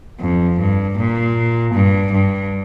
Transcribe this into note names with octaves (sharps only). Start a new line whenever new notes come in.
F2
G2
A#2
G2
G2